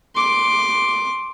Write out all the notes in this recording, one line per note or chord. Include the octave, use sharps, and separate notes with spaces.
C6 D6